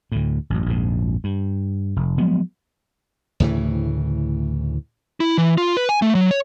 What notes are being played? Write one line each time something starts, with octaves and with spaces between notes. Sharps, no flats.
D2 A2
A1 F#2
A#1 F2 G#2
G2
F1
F3 F#3 G#3 B3
D2 A2 C#3 E3
E4
E3
F4
B4
G#5
A3
F#3
C#5